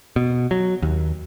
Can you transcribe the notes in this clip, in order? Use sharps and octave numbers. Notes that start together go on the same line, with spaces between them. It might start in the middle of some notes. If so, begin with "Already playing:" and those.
B2
F#3
D#2